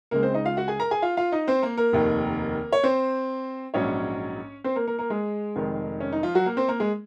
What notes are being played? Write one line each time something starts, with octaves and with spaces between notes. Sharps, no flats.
C#2 C#3 G#3 A#3 A#4
C4 C5
D#4 D#5
F4 F5
F#4 F#5
G#4 G#5
A#4 A#5
G#4 G#5
F4 F5
F4 F5
D#4 D#5
C4 C5
A#3 A#4
A#3 A#4
F1 D#2 D#3
C#5
C4 C5
A#1 G#2 F#3 C#4 C#5
C4 C5
A#3 A#4
A#3 A#4
A#3 A#4
G#3 G#4
F1 F2 D#3 G#3
C#4
D#4
F3 F4
F#3 F#4
A#3 A#4
C4 C5
A#3 A#4
G#3 G#4